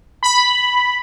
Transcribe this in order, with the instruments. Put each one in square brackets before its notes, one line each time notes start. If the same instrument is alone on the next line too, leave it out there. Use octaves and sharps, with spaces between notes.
[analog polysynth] B5